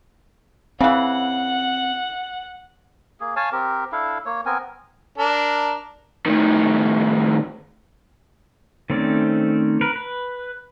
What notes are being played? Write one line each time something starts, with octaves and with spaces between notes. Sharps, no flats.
C#3 E3 C4 F#5
A#3 G#4
C#5 F5 G#5 A5
C4 G4 A#4
D4 E4 A4 F5
A#3 C#5
B3 C4 A#4 G#5
D4 A#4
A2 D#3
D#3 A3 C4 C#4 D5
A#4 B4
B4